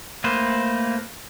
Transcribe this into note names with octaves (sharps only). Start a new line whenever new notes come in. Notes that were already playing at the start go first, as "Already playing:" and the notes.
A3 A#3 B4 C5